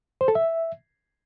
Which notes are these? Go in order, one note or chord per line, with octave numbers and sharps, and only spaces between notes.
C5
A4
E5